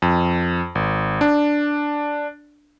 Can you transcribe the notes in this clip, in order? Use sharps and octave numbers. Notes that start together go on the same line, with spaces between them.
F2
G#1
D4